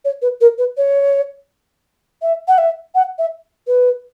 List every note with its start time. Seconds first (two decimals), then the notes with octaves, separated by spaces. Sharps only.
0.05 C#5
0.22 B4
0.41 A#4
0.58 B4
0.77 C#5
2.22 E5
2.48 F#5
2.58 E5
2.95 F#5
3.19 E5
3.67 B4